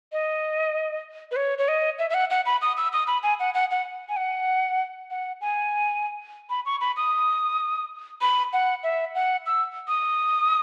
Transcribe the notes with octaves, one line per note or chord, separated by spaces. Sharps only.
D#5
B4
C#5
C#5
D#5
E5
E5
F#5
F#5
B5
D#6
E6
D#6
B5
G#5
F#5
F#5
F#5
G#5
F#5
F#5
G#5
B5
C#6
B5
D#6
B5
F#5
E5
F#5
E6
D#6